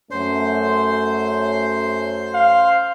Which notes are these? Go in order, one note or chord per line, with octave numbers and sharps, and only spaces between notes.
F#2 A3 C#4 C5 C6
F5